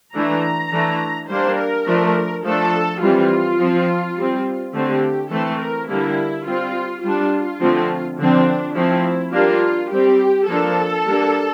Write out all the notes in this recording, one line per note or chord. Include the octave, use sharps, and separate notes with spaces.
E3 A3 D4 A#5
E3 A3 D4
G3 A#3 D4 C5
A#4
F3 A3 D4
F3 A3 D4 A4
E3 G3 C4 F4
F3 C4
G3 C4
D3 A3 C4 G4
E3 A3 C4 A4
A#4
D3 G3 A#3 E4
G3 C4 F4
G3 D4 F4
D3 F3 A3 C4
D3 F3 C4 D4
F3 A3 C4 E4
G3 A#3 D4 F4
G3 C4 G4
F3 A#3 D4 A4
G3 A#3 D4